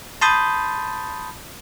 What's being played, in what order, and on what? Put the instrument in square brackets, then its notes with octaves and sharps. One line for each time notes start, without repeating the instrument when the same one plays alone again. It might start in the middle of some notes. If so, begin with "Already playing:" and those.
[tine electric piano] A5 B5 C6 D#6 G6 A6